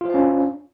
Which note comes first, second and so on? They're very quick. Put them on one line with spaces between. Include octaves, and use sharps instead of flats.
F4 C5 F5 C#4 D4